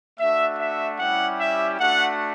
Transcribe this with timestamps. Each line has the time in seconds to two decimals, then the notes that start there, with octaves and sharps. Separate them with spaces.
0.19 A3 D4 F#4 E5
0.59 E5
0.99 G3 C#4 E4 G4 F#5
1.40 E5
1.80 A3 D4 F#4 F#5